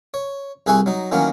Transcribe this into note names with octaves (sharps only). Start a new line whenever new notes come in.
C#5
C2 G#4 B4 E5 G#5 C#6
F#3 D#4
D#3 E3 F#3 A#3 B3 C#4